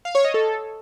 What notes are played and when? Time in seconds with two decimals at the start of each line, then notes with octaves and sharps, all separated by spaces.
0.05 F5
0.15 C#5
0.25 D#5
0.34 A4